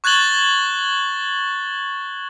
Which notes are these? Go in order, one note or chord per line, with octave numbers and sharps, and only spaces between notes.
C#6 F#6 G#6 A6 F#7 G7